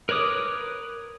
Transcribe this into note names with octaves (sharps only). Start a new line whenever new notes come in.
A#4 B4 C#5 D6 D#6